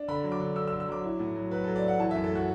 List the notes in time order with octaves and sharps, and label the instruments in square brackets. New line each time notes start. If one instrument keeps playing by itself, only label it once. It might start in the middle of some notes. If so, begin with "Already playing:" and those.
Already playing: [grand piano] D4
D3 B5
F#3
D6
D3
D3 E6
E6
D3
E6
F#3 D6
E4
A2
F#3
F#3 B4
F#3 A4
D5
A3
F#5
E3 A5
F#2 E5
A4
A3 F#4